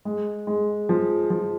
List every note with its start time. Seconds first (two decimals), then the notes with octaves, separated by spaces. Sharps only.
0.05 G#3
0.47 G#3
0.89 F3
1.30 F3